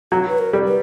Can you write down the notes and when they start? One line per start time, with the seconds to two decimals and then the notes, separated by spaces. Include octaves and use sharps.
0.12 F#3 F#4
0.28 B4
0.38 A#4
0.53 G3
0.67 B4